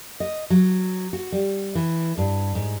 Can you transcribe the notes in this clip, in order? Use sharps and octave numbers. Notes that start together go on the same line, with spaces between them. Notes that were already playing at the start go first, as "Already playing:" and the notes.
D#5
F#3
F#4
G3
E3
G2
G#2